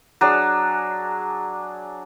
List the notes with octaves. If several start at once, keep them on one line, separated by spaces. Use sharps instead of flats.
F#3 D4 G#4